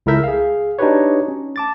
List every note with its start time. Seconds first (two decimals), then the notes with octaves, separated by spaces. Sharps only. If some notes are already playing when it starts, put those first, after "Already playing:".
0.06 C#2 E4 A4 A#4 E5 G6
0.24 G#4 F5
0.79 D4 D#4 F#4 G4 B4 C#5
1.28 C#4
1.56 A5 D6 A6